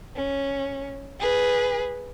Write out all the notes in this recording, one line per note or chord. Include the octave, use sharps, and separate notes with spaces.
C#4
G#4 B4